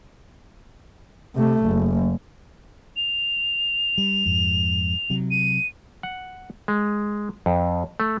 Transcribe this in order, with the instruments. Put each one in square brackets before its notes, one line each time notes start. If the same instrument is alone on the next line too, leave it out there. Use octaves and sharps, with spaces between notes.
[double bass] C3 A3
F#1
[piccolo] F7
[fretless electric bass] G3
F2 G#2
C3 F#3
[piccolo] D#7
[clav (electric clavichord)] F#5
G#3
F2
A3